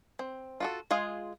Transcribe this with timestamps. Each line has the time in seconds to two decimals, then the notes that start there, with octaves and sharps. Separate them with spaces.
0.19 C4
0.60 F4 F#4 A4
0.91 G#3 F4 G#4 F5